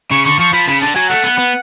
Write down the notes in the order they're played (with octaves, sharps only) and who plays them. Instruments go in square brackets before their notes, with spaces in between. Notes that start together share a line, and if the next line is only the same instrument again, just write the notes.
[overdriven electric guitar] C#3 [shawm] C#6
[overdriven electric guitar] D3 [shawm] C#6
[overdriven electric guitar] F3 [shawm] C#6
[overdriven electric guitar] F3 [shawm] B5
[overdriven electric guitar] C#3 [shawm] B5
[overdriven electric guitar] D3 [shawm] A5
[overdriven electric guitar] F#3 [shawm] G#5
[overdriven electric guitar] A3 [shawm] F#5
[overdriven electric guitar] B3
B3